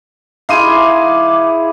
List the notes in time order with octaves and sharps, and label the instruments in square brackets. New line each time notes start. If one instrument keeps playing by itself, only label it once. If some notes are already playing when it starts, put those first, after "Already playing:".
[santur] D#4 E4 G#4 [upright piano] F5 C6 D#7 [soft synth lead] D6